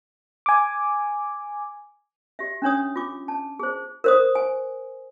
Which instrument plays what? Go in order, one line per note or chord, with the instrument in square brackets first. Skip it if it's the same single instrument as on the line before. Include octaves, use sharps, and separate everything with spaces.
[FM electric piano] G#5 D6
[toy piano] G4 E5
C#4 D4 C#5 D#6
F4 D6
A5
G#4 C5
A#4 C5 D#6
G#5